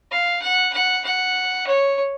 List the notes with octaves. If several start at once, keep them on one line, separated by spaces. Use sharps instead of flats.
F5
F#5
F#5
F#5
C#5